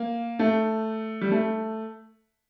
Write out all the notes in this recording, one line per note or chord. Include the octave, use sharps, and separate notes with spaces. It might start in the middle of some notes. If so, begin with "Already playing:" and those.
Already playing: A#3
A3
G3
A3